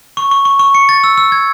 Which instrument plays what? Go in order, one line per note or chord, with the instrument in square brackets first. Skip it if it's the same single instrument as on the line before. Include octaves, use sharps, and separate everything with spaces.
[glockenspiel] C#6
C#6
C#6
C#6
C#7
A6
E6
E6
G#6